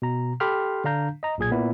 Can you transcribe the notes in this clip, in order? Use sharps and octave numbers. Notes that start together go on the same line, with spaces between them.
B2 A#5
G4 A4 G5 B5 C6 F6
D3 D4 F5 A#5 G6
D#5 A#5
B1 A#2 G#4 G#6
A#2 B3 E4